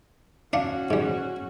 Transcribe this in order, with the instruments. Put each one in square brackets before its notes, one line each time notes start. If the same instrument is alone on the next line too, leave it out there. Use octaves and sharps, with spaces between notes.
[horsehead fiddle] C#4 F#4 [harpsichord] D4 F5 F#5
[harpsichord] G#2 G3